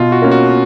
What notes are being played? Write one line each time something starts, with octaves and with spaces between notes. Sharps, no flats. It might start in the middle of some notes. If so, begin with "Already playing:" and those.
Already playing: B2 F4
F#4
A#3 C#4
F#4